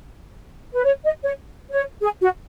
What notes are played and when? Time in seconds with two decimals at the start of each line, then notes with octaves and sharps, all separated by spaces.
0.73 B4
0.85 C#5
1.04 D#5
1.24 C#5
1.72 C#5
2.01 G#4
2.21 F#4